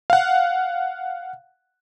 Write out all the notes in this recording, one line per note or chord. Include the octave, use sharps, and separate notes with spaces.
F5 F#5